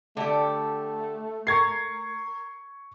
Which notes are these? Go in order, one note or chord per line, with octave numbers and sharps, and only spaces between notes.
D3 A3 G4
A#4 C#6 G#6 C7